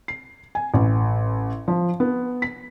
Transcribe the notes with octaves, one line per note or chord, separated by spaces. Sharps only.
C7
G#5
A1
F3
B3
B6